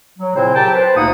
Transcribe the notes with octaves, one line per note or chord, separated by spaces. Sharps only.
F#3
A#2 C#3 F#3 C4 E4 C5
G4 A#4 G5 A5
B4 C5
D2 A#2 A#3 D#4 F#5 D#6